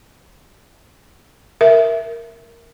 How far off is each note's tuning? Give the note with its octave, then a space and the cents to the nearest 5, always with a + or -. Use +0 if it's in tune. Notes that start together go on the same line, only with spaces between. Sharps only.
A#4 +0 E5 +0